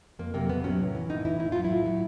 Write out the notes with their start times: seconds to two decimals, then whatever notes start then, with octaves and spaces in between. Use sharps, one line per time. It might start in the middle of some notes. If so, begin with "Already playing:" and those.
0.19 F2 A#3
0.34 C3 D#3 F#3 A#3
0.49 F2 B3
0.64 C3 D#3 F#3 C#4
0.79 A2
0.95 E3
1.10 A2 D#4
1.25 E3 E4
1.40 A2 E4
1.52 F#3 F4
1.64 E4
1.70 A2
1.86 F#3